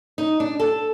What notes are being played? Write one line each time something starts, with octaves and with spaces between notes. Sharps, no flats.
D#4
D4
A4